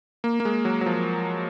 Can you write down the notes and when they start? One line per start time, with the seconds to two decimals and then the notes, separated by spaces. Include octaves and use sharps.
0.24 A#3
0.40 A#3
0.45 G#3
0.65 F#3
0.81 F#3
0.86 F3